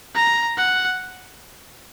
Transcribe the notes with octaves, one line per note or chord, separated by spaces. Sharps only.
A#5
F#5